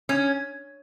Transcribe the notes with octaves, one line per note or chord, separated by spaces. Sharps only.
C#4